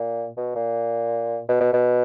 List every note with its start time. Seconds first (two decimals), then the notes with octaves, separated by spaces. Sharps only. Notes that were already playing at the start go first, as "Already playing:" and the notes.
Already playing: A#2
0.37 B2
0.56 A#2
1.49 B2
1.61 B2
1.73 B2